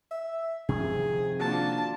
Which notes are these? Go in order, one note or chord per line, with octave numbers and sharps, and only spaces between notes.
E5
C3 D#3 F3 G#4
A#3 D4 F4 F#4 A5